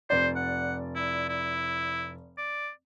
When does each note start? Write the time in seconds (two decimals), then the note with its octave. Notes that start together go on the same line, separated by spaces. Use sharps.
0.10 F1 C5 D5
0.36 F#5
0.96 E4
1.29 E4
2.38 D5